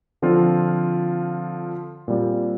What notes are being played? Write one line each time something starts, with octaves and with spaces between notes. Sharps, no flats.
D3 F3 C4 F4
A#2 G3 C4